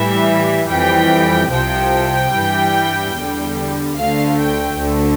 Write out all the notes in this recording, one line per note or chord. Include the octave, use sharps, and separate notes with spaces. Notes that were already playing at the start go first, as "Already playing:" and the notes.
Already playing: A2 E3 G3 E5
F2 E3 G3 G5
C2 C3 F3 G5
G2 E3 G3
E2 D3 G3
D2 D3 A3 F5
G5
D2 D3 A3